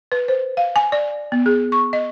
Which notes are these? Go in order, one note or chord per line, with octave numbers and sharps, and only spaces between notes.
B4
C5
F5
G#5
D5
B3
G#4
C#6
D#5